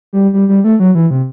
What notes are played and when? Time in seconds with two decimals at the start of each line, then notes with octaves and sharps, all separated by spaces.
0.13 G3
0.33 G3
0.49 G3
0.64 A3
0.80 F#3
0.95 E3
1.11 C3